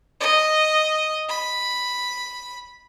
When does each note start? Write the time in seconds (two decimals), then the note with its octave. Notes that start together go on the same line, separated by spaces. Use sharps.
0.21 D#5
1.29 B5